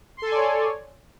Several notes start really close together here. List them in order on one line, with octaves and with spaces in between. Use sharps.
C6 A4 G#5 D5 C#5